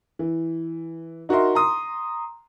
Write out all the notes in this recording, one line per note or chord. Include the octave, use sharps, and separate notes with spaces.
E3
D#4 F#4 A#4 E5 C6
A#5 C6 D#6